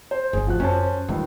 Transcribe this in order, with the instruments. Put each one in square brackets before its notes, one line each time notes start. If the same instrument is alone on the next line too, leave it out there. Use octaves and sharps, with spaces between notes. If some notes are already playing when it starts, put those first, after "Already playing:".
[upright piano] C5
[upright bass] G1 D4 [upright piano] G#4
[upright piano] F3 F#4 F#6
[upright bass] F#2 [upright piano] C#4 C5 A5
[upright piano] C#2 G2 D#3 [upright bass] E3